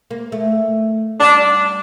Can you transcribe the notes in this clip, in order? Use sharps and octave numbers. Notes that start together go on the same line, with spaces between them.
A#3
A3
G3 D4